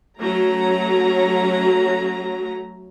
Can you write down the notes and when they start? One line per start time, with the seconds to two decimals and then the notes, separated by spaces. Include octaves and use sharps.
0.17 F#3 A3 C#4 A#5